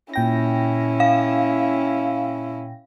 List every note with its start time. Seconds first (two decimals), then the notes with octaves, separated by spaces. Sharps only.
0.14 A#2 C#4 E4 G5 A#6
1.00 F5